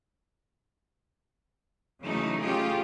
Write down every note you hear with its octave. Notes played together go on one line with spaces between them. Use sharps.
C#3 E3 F#3 A3 D#4
A3 C#4 F4 G4 G#4